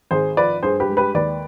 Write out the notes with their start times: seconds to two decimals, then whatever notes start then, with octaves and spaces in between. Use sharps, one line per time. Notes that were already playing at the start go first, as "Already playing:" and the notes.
0.11 G#1 G#4 C5
0.37 F3 B4 D5
0.63 G2 G#4 C5
0.80 G4 B4
0.89 G#3
0.97 G4 B4
1.14 D#2 B4 D5